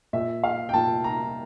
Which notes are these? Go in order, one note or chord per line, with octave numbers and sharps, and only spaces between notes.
A#2 E5
F5
G5
A#2 A5
A#5